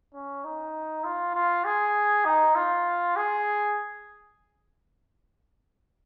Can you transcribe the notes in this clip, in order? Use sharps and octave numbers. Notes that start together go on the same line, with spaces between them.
C#4
D#4
F4
F4
G#4
D#4
F4
G#4